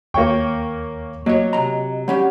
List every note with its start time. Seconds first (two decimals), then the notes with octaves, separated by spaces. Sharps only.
0.14 D#2 A#3 C#5 G5 C#6
1.26 F#3 A#3 C#5 D#5
1.53 C3 A#5
2.08 G3 C#4 G4 F#5